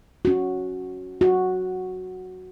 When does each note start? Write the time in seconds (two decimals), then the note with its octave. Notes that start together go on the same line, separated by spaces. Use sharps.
0.25 C#4 F#4
1.21 F#4